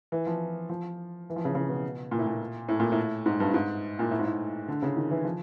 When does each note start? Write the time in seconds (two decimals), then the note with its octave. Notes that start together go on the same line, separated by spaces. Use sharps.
0.12 E3
0.26 F3
0.69 F3
1.30 E3
1.36 F3
1.45 C#3
1.55 C#3
1.69 B2
2.11 A#2
2.19 A2
2.27 A#2
2.68 A2
2.80 A#2
2.92 A2
3.26 G#2
3.40 G2
3.54 G#2
3.99 A#2
4.11 A2
4.19 G#2
4.25 A2
4.68 D3
4.82 C#3
4.97 D#3
5.11 E3
5.24 F3